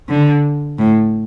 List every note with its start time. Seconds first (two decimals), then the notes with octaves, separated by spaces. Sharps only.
0.09 D3
0.78 A2